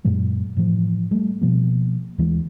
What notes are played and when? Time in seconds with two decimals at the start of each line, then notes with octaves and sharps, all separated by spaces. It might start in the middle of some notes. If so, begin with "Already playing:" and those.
0.04 F#2 A#2 F#3 G#3
0.57 A2 E3 F3
1.11 G3 A3 A#3
1.41 B2 F3 A#3
2.18 D#2 E3 G#3